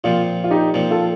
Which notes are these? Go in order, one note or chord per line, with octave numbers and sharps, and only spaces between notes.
A#2 F3 C4 F4
F4
D#4 G4
A#2 F3 C4
F4 A4